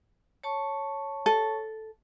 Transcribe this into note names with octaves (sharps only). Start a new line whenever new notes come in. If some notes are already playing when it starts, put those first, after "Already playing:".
C#5 A5 C#6
A4